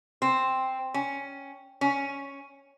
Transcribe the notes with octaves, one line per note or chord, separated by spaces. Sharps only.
C4
C#4
C#4